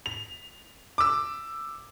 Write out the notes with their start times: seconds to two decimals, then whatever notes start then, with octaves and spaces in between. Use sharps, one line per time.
0.06 F7
0.98 D6 E6